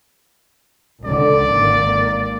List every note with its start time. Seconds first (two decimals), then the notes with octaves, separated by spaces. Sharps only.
1.05 C#2 D3 D5
1.51 G#1 A#3